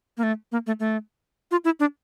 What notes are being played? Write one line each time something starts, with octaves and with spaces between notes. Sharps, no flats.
A#3
A3
A#3
A3
A3
F4
E4
D4